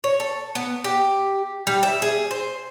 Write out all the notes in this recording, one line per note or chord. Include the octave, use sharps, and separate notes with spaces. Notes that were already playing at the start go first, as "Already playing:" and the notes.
C#5
A4
B3
G4
G3
E5
G#4
C5